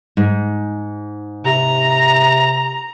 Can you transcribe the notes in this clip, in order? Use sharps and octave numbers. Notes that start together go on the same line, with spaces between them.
G#2
C3 A#5